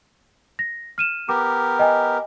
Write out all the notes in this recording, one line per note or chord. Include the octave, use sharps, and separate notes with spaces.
A#6
F6 D#7 E7
B3 G4 A#4 D6
D#5 G5 G#5